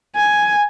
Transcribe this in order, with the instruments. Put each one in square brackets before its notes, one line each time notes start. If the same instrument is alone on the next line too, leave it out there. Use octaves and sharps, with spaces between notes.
[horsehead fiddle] G#5